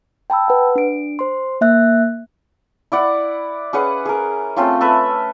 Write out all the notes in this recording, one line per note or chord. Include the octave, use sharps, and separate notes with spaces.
G5 A5 B5 E6
B4 F#5
D4 D7
C5 C6
A#3 E5 F#6
E4 D5 F#5
C#4 G#4 B4 F#5
G#4 A#4
A3 C4 C#4 F4
A4 B4 E5